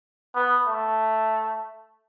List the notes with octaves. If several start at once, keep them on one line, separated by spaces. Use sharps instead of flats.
B3
A3